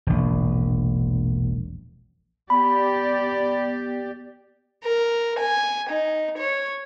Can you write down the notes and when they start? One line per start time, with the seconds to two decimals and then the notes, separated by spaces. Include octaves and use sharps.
0.07 E1 A#1
2.50 B3 G4 D5 B5
4.84 A#4
5.40 G#5
5.88 D#4
6.36 C#5